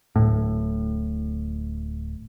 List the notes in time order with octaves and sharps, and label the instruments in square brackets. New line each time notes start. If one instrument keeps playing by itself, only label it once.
[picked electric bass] D1 A2